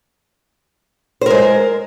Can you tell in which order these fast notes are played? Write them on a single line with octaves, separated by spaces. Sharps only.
C5 A#4 G#3